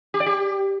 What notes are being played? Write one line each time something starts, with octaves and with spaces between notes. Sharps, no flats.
G4
D5
G4